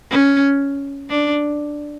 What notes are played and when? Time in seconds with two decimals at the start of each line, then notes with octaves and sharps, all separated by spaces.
0.11 C#4
1.10 D4